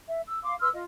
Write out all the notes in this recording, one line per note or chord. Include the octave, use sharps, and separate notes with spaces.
E5
E6
F5 C6 D6
B4 C6 E6 F6
F4 D#5